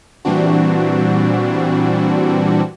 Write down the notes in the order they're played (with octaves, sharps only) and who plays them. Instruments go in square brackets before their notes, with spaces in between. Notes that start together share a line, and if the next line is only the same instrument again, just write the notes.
[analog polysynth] A#2 E3 G3 C4 D4 F#4